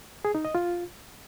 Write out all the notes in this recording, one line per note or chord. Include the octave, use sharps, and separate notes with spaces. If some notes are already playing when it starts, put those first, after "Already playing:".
G#4
D#4
D#5
F4